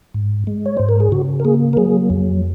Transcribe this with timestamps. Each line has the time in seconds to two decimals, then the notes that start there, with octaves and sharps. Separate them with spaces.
0.14 G#2
0.47 G#3
0.66 C#5
0.77 G#2 C5
0.89 A#4
1.00 G#4
1.12 C#3 F#4
1.40 A#4
1.45 A#3 G#4
1.73 A#4
1.77 F#3 G#4
2.10 F2